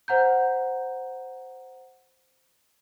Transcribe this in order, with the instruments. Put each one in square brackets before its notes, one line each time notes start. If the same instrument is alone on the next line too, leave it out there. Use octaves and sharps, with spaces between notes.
[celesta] C5 F#5 A#5 G6